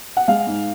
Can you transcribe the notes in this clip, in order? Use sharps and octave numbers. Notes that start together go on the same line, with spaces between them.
F#5
G#3 F5
G#2